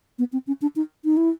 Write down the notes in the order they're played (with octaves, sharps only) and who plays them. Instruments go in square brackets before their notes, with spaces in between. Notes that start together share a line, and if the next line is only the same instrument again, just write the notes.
[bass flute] B3
C4
C#4
D4
D#4
D#4
E4